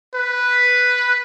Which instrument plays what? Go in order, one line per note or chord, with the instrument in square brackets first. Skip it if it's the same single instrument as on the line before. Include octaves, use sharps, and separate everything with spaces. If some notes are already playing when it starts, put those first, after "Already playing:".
[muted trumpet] B4